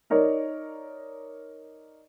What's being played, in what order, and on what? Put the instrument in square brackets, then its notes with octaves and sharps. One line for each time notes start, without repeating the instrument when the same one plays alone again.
[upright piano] D#4 A#4 C#5 D5